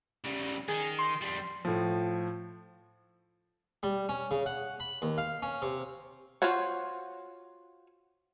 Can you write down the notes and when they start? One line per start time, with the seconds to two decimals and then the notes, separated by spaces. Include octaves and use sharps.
0.24 C#3 G3
0.68 D#3 G#4
0.99 C6
1.21 F2 G3
1.65 A2 F3
3.83 G3
4.09 C#4
4.31 C#3
4.46 F#5
4.80 B5
5.02 D#2
5.18 F5
5.42 C#4
5.62 C3
6.42 F4 F#4 C5 C#5 F#5